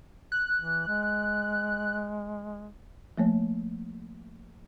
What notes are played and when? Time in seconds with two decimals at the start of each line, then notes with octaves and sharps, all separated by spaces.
0.32 F#6
0.57 E3
0.88 G#3
3.18 F3 A3 A#3 C#5